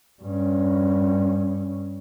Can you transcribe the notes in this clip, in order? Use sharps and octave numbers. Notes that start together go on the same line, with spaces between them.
G2 C#4